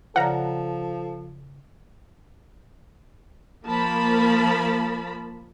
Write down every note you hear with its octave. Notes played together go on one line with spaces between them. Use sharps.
C#3 F3 A4 D5 F#5 A#5 A#6
F3 A#3 A#4 A5 B5